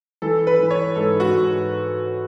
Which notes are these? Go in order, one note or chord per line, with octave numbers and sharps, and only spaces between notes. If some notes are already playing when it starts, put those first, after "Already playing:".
E3 A4
B4
E3
C#5
G#2 A4
F#4
G#2